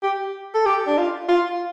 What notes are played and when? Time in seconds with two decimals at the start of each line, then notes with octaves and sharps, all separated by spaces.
0.03 G4
0.55 A4
0.66 G4
0.87 D4
0.97 F4
1.29 F4